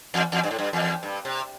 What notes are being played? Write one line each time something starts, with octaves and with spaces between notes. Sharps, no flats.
E2
E2
G2
A2
G2
E2
G2
C3